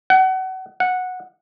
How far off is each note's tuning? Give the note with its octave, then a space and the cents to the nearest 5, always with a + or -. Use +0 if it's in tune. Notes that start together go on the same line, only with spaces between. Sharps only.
F#5 +30
F#5 -10